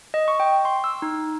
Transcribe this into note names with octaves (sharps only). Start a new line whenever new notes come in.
D#5
C#6
G5
C6
E6
D#4